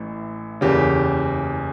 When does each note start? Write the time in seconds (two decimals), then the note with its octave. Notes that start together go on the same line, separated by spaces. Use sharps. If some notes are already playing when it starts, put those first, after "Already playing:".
Already playing: A1 A2 E3
0.61 F#1 E2 C#3 G4